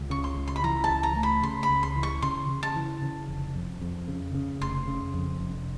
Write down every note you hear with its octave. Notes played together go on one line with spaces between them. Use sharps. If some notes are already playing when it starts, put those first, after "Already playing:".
Already playing: C#2
C#3 C#6
C6
C#2
C6
B5
E3 A#5
A5
C#2
A#5
A3
B5
C#3 C6
B5
C#2
C6
E3
C#6
C#3 C6
C#3
A5
E3
C#3
F1
F2
F2
C#3
C#3
F1 C6
C#3
F2
F1